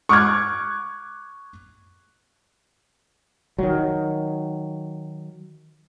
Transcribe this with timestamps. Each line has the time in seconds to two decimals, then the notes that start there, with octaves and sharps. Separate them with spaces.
0.09 C#6 D6 F6 F#6 G#6
3.59 D#3 F#3